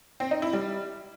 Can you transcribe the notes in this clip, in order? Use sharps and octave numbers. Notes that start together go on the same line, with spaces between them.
C4
D#4
E4
G3